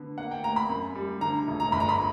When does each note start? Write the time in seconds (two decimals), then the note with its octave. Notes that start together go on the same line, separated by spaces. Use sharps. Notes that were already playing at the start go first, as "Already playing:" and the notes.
Already playing: D3 B3
0.18 A#3 F#5
0.31 G5
0.44 A#3 A#5
0.56 B5
0.69 F#2
0.95 G3
1.21 D3 A#5
1.48 E1
1.60 A#5
1.72 G1 B5
1.80 A#5
1.89 B5